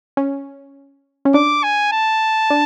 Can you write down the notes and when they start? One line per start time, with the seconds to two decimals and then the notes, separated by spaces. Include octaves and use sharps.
0.17 C#4
1.25 C#4
1.34 D4 D6
1.64 G#5
1.92 A5
2.50 D4